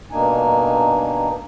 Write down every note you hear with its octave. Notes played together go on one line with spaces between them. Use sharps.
G2 B2 A#3 D4 D#4 G#5